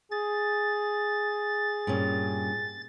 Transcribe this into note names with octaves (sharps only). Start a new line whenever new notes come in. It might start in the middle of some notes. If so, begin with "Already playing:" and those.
G#4 A6
G2 A#2 C#4